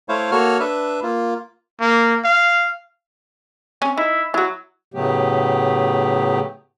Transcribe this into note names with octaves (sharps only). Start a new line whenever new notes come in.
A3 E4 C5 C#5 F5
A#3 F#4 A4 C#5 F6
D4 B4 E5
A#3 F4
A#3
F5
C4 C#4 G#5
D#4 E4
F#3 E4 F#4
A2 C#3 F#3 A3 B3 G4